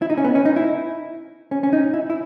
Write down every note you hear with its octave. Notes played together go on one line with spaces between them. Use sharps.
E4
D#4
C#4
B3
C#4
D#4
E4
C#4
C#4
D#4
E4
E4